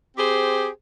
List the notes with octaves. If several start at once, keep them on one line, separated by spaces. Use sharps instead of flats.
C4 G4 G#4 C5